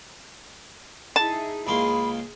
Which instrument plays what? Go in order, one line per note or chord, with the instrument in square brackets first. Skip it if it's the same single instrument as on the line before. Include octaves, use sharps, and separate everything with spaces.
[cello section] D#4 E4 G#4 [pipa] A5
[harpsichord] C#2 A#3 C6 [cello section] G#4 [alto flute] B5